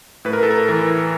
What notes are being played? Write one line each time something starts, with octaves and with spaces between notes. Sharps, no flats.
A2 B4
A#4
A4
A#4
E3 A#4